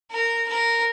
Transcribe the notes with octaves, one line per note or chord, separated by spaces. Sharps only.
A#4
A#4